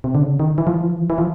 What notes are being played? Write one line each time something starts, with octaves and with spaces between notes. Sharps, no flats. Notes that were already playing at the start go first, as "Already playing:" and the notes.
C3
D3
C#3
D#3
E3
F3
E3
F3
E3
F3
E3
F3